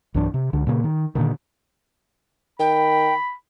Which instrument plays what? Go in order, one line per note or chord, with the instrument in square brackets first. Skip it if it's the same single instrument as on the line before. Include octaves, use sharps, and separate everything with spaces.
[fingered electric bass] B1 G2 E3 D4
C3
C#2 D3
A#2 C#3 A3 A#3
D#3
A#2 D3 D#3
[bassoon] D#3 [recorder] G5 [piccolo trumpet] B5